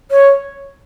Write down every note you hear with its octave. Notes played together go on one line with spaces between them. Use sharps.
C#5